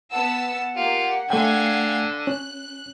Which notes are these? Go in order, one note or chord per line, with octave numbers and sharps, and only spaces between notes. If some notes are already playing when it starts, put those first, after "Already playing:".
B3 F#5 A5 E6
A#3 F4 G4
D3 A3 F5 G5 G#5 G#6
C#4 F#6